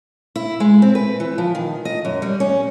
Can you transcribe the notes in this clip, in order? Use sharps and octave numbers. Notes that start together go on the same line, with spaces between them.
E4
G#3
C4
B4
E3
F3
D#3
D#5
F#2
G3
C#4